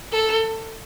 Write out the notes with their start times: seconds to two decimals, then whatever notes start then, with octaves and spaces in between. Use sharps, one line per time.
0.12 A4